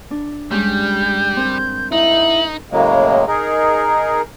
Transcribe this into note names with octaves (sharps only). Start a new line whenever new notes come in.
D4
G2 G3 G#3 C#4 G6
C4 A#4
D#4 E4 F#7
F#2 A2 C#3 F#3 G#3 A#3
D#4 G#4 A#4